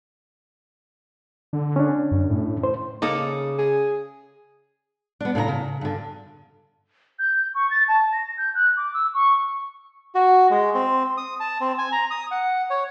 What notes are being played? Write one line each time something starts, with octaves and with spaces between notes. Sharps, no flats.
D3
C#4 D4
F#2
A2
C5
C#3 A#3 D#4 A4 D5 D#6
G#4
B3 D4
A2 C#3 F#5 A#5
C#3
G2 D3
G6
C#6
A6
A5
A#6
G6
F#6
D6
E6
C#6
F#4
G#3
C4
D#6
A5
C4
G#5
A#5
D#6
F#5
C#5